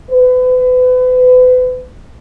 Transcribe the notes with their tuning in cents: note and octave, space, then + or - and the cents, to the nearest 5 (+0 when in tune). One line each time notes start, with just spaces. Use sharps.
B4 +35